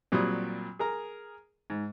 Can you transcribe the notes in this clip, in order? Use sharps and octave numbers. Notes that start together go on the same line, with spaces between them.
A#2 F#3 G3 C4 D#6
G#4 A#4 A#5
G#2